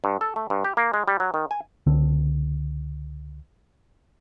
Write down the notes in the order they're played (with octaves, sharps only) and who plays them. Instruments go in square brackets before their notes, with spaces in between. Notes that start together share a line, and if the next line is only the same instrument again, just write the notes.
[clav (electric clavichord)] G2
A4
A3
G2
G4
A#3
G#3
G3
F#3
D#3
G#5
[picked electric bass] C#2 D3 C4